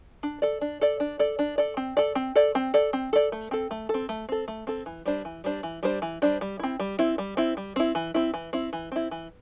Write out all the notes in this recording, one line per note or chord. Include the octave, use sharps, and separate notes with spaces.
D4
A4 D5
D4
A4 D5
D4
A4 D5
D4
A4 D5
C4
A4 D5
C4
A4 D5
C4
A4 D5
C4
A4 D5
A3
C4 A4
A3
C4 A4
A3
C4 A4
A3
C4 A4
E3
G3 D4 C5
E3
G3 D4 C5
E3
G3 D4 C5
E3
G3 D4 C5
G3
C4 E4
G3
C4 E4
G3
C4 E4
G3
C4 E4
E3
C4 E4
E3
C4 E4
E3
C4 E4
E3